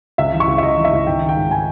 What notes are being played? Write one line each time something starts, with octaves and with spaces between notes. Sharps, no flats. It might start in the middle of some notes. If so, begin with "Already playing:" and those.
C#2 E5
E3
C#6
C#2
E5
C#2 D#5
E3
E5
C#2
G#1 G5
D#3
G5
G#2
G#5